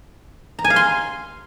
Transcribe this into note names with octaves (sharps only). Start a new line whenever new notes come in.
A#5
G#5
F5
C6